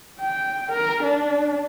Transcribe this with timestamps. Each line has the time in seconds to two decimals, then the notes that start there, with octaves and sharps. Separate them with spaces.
0.20 G5
0.71 A#4
1.03 D4